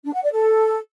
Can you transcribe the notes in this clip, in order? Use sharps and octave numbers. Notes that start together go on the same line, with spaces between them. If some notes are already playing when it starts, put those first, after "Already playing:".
D4
F#5
D5
A4